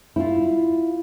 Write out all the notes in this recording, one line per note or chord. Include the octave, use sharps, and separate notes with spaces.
E4 F4